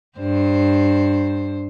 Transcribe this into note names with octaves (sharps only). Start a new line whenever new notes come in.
G2 C5